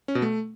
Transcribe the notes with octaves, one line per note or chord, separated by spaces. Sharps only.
C#4
B2
A3